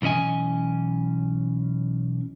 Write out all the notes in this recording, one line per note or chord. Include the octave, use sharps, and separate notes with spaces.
B1 E3 C#4 D#5 G#5